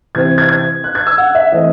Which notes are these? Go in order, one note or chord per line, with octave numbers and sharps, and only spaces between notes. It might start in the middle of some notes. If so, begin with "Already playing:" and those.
C3 E3 C4 G#6
G#6
G#6
F#6
G#6
E6
F#5
E5
E3 A3 C4 D#5